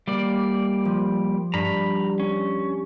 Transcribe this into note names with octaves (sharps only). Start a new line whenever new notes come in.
G3 A#3 D5
F3
G2 A#5 B5
C#4